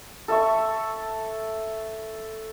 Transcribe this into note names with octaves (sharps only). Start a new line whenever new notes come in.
A4 E5 C#6